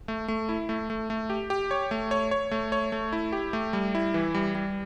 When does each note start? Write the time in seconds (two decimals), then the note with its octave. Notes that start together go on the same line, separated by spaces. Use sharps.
0.08 A3
0.28 A3
0.49 E4
0.69 A3
0.90 A3
1.10 A3
1.30 G4
1.50 G4
1.71 C#5
1.91 A3
2.11 C#5
2.31 C#5
2.51 A3
2.72 C#5
2.92 A3
3.13 E4
3.32 G4
3.53 A3
3.73 G3
3.95 E4
4.14 E3
4.35 G3
4.55 G3